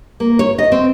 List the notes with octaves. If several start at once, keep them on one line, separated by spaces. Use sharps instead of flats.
A#3
C#5
D#5
C4